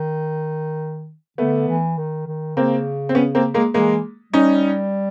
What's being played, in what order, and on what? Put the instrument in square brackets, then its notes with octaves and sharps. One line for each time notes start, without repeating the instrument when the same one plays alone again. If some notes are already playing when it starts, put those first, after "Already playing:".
Already playing: [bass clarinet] D#3
[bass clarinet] D3 [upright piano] A3 B3
[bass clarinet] E3
D#3
D#3
[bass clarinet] C#3 [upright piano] A#3 C4
[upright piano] C4
B3 C#4
A#3 C4
G#3 A#3
[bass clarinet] E3 [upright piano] G#3 A#3
[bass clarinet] G3 [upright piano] C#4 D#4